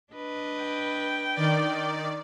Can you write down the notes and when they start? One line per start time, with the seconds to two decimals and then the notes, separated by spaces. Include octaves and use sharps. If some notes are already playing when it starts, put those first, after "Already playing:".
0.13 D4 B4 D#5
0.63 G5
1.35 D#3 D5